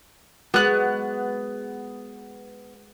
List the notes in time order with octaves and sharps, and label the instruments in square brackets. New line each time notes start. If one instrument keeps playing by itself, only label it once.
[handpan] G#3 F#4 [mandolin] B3 F#6